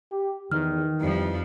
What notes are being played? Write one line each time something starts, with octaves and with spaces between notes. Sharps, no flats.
G4
E2 D#3 F6
F2 E3 F3 G3